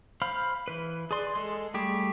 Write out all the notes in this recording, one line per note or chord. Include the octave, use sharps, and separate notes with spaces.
C5 F5 B5 F6
E3 B4
G#4 B4 D5 C6
G#3 A4
G3 A3 G4 G#4